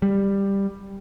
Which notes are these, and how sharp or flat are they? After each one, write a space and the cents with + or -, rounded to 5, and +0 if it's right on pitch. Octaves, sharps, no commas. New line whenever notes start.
G3 +10